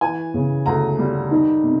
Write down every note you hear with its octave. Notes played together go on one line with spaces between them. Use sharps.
E3 G#5
C#3
D2 A#5
G3
D#3
C3